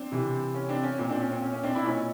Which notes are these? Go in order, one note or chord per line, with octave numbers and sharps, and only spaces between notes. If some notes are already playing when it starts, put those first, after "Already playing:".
Already playing: C4 D4
C3 E3
C#4
C4 D4
C#4
A#2 C4
C4 D4
C#4
C4
C#4
C#4
C4 D4
D4 E4
A#2 C#4 D#4